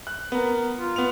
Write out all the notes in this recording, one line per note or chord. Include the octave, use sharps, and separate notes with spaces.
F#6
B3 A#4
F4
B3 F7